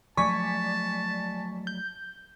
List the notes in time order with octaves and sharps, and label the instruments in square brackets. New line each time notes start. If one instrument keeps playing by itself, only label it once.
[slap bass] F3 F#3 A3 [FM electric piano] D5 G#5 B6 [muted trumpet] A5 [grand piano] C#6
[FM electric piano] G6